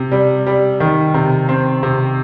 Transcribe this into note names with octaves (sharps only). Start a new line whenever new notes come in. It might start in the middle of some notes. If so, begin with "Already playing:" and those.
Already playing: C3
G3
G3
D#3
C3
C4
C3